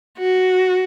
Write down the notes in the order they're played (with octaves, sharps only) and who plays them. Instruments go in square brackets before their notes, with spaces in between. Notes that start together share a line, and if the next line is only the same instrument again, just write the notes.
[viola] F#4